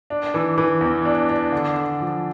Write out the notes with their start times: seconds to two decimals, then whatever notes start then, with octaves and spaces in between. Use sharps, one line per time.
0.10 D4
0.34 E3
0.58 E3
0.81 E2
1.05 D4
1.29 D4
1.52 D3
1.76 D3
2.00 F3